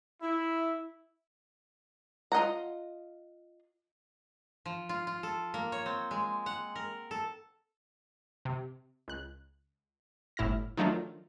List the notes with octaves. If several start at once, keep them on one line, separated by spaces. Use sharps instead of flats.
E4
F4 D#5 F#5 A#5
F3
F4
F4
A4
A#3
C#5
C4
G#3
F#5
A#4
A4
C3
C#2 F#6
G1 A2 E4 F6 A#6
D#3 F3 F#3 A3 D4 F4